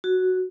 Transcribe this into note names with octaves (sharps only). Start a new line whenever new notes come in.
F#4